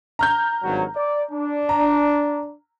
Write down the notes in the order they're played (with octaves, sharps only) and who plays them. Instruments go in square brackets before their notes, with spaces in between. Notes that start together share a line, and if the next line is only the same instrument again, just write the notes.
[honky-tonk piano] A#5 F6 G6
[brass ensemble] G#1 G2 F#3
D5
D4
[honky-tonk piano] A#5